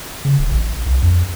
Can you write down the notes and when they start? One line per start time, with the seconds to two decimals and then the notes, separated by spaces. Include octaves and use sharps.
0.25 C#3
0.39 D1
0.51 A1
0.86 C2
1.02 F2